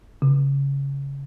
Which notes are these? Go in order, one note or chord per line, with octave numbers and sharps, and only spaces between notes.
C#3